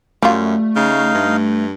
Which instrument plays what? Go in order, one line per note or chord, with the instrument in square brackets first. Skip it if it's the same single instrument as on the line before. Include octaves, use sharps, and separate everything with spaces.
[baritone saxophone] F#2 [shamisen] G3 F4 [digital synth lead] A3
[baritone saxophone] C#3 [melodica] D#4 F5
[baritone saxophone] G2